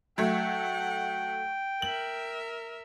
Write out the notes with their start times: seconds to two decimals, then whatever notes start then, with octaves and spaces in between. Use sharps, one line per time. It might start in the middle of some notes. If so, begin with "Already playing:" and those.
0.18 F#3 A3 F#5 G5
1.82 A#4 E5 F#7